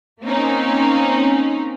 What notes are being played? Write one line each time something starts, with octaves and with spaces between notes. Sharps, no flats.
A#3 C4 C#4 D#4